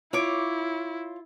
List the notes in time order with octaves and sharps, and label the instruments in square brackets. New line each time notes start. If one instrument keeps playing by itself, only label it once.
[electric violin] E4 [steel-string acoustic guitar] F4 [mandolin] C#5 C#6 D6